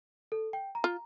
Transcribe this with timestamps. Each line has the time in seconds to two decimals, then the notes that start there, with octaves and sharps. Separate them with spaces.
0.32 A4
0.53 G5
0.75 A#5
0.84 F4